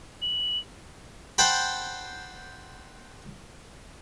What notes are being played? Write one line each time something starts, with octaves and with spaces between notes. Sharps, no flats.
F#7
C5 F#5 G5 A5 B5